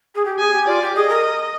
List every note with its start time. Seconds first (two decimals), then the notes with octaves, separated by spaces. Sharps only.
0.15 G#4
0.25 G4
0.39 G#4 G#5
0.53 G4
0.67 F4 D5
0.82 G4
0.95 G#4 D#5
1.09 A#4